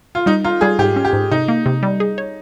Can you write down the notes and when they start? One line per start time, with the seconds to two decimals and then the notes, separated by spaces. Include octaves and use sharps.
0.15 F4
0.26 G3 D#4
0.44 D#4 F4
0.61 G3 G#4
0.79 G#2 G4
0.96 C#4
1.05 G4
1.13 G#2
1.32 C3 D#4
1.48 A#3
1.66 C3
1.83 G3
2.00 G#4
2.18 C#5